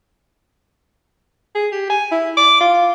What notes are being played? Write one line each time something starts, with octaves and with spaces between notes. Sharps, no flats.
G#4
G4
G#5
E4
D6
F4